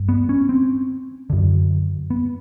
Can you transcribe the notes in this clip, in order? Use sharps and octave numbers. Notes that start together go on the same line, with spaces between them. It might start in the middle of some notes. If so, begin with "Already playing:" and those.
Already playing: G2
B3
C#4
C4
F#2 D3
B3